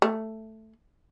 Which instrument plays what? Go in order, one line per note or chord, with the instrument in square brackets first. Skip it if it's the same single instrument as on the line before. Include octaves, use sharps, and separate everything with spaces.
[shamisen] A3